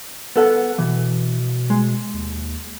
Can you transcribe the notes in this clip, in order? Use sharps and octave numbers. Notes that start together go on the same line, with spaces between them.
B3 A4 F#5
B2 E3
G#3
D#2